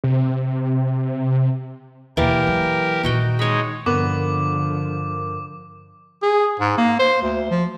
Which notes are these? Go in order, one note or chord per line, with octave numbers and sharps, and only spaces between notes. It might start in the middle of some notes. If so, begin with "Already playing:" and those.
C3
D#2 B2 E3 A#3 G4 A#4 D5
F#3
A#2 D#3 D#4 F#4 G5
G#3 D#4 C#5 B5
G2 D3 F3 B3 A#4 D6
G#4
G#2
A#3
C5
D2
F3